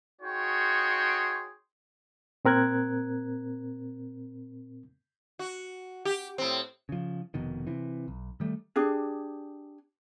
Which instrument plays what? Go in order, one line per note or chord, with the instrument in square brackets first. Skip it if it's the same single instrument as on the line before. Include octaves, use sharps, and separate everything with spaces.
[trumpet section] D#4 F#4 G#4 C#5 G5 C6
[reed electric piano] A#2 C4 A#4 F#6 G#6
[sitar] F#4
G4
A2 C4
[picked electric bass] C#3 F3
F1 F2 B2 D#3
C3 E3
B1
D#3 G3 A3
[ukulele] D4 G4 G#4